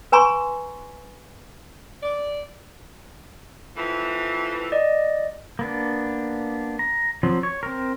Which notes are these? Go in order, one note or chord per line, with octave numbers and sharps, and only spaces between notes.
B4 G#5 A#5 C6 C#6
D5
F2 E3
D5 D#5
A#3 B3 D4
A#5
F3 F#3 C4
C#5
C4 A#4